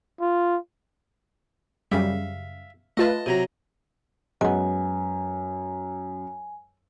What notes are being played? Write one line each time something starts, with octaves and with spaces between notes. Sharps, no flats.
F4
F#2 C#3 G3 E5 F5
A3 F4 B4 D#5 A5
C3 F#3 A#5
F#2 G#3 B3 G#5